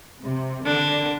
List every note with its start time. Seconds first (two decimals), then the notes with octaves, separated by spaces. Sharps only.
0.24 C3
0.65 D3 D4